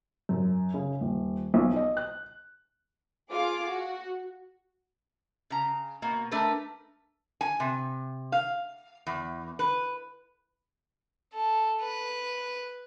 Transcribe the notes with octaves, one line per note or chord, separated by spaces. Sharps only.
F#2
C#3
D#1
B1
D#5
F#6
F4 G#4 F5 D6
F#4
C#3 A#5
B2 A#3
A3 D4 A#4 B4
G#5
C3
F5
E2
B4
A4
B4